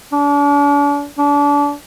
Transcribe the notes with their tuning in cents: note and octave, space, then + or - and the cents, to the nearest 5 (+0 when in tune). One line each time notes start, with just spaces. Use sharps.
D4 -40
D4 -30